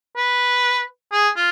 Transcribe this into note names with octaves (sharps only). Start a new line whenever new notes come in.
B4
G#4
F4